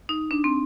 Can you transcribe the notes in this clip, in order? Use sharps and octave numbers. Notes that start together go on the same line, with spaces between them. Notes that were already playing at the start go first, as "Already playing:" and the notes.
D#4
D4
C4